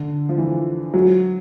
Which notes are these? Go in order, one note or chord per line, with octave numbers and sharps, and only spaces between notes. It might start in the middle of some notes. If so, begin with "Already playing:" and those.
Already playing: D3
F3
E3
F#3